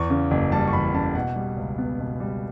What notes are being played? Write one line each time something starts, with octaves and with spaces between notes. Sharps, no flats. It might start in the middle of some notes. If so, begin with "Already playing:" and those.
Already playing: E2 C#6
C#3
F#1
G3 A5
C#6
E2 B5
C#3 A5
B2 F#5
G3
C#2
B3
B2
G3